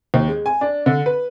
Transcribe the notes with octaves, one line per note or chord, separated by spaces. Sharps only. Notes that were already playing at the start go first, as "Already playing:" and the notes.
D#2
G#3
G#5
D4
D3
B4